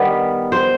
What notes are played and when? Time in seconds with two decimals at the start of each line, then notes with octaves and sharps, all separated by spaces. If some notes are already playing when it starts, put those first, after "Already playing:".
Already playing: D#3 G3 B3 B4
0.52 C5